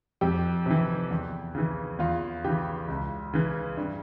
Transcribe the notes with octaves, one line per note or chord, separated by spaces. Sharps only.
F2 G4
C3 E3
E2
C#3 E3
E2 F4
C#3 E3 G4
C#2
C#3 E3
G2